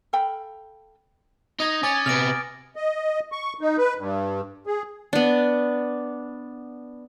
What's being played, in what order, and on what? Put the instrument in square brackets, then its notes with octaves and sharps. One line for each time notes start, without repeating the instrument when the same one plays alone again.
[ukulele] A4 F5 G5 B5
[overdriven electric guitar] D#4 [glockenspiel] D#6 G#6 A#6
[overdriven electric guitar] C#4 [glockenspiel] G#5 D6 A6
[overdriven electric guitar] C3 B3 [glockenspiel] F6 A#6 D7
[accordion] D#5
C#6
D#4
B4
G2
G#4
[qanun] B3 D4